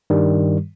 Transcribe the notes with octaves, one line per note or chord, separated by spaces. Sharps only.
G2 D#3 G3